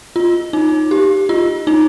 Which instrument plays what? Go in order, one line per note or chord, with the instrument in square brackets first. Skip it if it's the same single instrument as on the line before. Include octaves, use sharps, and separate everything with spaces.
[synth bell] F4
D#4
G4
F4
D#4